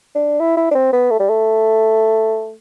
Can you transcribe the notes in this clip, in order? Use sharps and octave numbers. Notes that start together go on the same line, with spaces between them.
D4
E4
E4
D4
C4
B3
A3
G3
A3